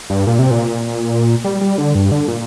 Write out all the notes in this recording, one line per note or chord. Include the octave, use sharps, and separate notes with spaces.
G2
A#2
C3
A#2
G3
G3
D3
G2
D3
A#2